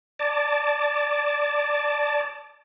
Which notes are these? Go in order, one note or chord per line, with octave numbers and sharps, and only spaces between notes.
D5 A5